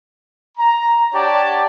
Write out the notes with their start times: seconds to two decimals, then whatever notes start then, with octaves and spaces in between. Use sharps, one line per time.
0.58 A#5
1.14 D4 G4 C#5 D5 F#5 A5